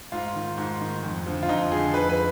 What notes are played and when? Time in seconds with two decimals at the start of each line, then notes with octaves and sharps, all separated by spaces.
0.12 G#2 F4
0.35 D#3
0.58 G#2
0.81 D#3
1.03 F2
1.26 D3 F3
1.43 F4
1.49 F2 D#4
1.72 D3 F3 G#4
1.94 F2 B4
2.09 B4